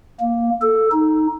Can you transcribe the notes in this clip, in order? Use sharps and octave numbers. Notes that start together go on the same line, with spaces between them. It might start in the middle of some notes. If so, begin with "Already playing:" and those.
A#3
A4
D#4